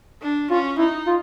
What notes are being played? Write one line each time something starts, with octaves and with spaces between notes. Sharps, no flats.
D4
C#4 F4
D#4 E4
F4